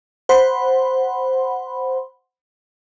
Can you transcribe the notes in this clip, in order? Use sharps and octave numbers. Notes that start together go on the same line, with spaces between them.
C5 F#5 B5 C6